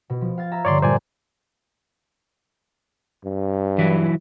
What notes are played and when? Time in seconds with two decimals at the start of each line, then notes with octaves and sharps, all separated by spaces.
0.10 B2
0.21 F3
0.38 F5 G#6 A6
0.52 E5 A#5
0.65 G2 D3 C#5 D5 C6
0.82 A#2 G3 C5 D5 G#5
3.25 G2
3.79 E3 F#3 E4